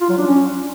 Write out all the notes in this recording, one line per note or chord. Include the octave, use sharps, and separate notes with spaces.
F4
F#3
D4
C#4